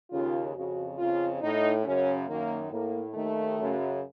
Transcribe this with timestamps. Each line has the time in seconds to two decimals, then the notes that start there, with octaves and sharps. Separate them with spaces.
0.11 D#2 C#3 F4
0.55 F2 C#3 F#4
0.98 F2 C#3 F4
1.41 A2 D#4
1.84 F#2 C#3 C#4
2.28 F#2 D#3 A#3
2.71 A2 A#3
3.14 D#2 D#3 A3
3.57 F#2 C#3